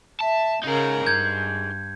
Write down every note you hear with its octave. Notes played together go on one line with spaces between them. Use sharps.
E5 A5
C#3 D#4 G#4 A#4
G2 G6 G#6